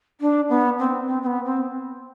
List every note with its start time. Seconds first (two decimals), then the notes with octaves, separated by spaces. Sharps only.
0.21 D4
0.49 B3
0.79 C4
1.07 C4
1.22 C4
1.26 B3
1.45 C4